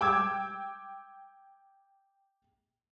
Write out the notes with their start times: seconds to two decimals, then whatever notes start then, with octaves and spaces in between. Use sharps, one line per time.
0.01 G5 D6 E6 G#6